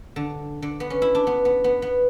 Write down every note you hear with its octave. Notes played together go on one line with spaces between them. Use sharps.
D3
D3
B3
C#4
E4
D4
B3
B3
B3
B3